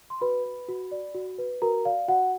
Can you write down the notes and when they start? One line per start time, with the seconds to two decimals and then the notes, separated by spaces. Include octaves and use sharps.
0.10 C6
0.21 F#4 B4 B5
0.44 B4
0.68 F#4
0.92 D5
1.15 F#4
1.38 B4
1.62 F#4 A#4 A#5
1.85 D5 F5
2.08 F#4 F#5